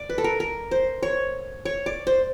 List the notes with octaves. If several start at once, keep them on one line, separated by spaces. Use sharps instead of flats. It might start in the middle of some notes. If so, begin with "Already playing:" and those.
Already playing: D5
B4
A4
A#4
A#4
C5
C#5
C#5
D5
C5